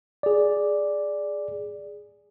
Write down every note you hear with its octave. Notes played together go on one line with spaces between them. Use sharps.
G#4 D5